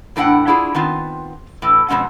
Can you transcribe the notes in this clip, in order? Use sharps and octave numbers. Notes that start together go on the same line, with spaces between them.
E2 A2 D4 D#4 F#5 G5
D4 E4 F4 G#4
D#3 B3 C4 F4
A2 E3
F2 B2 G#3 C#4 F#5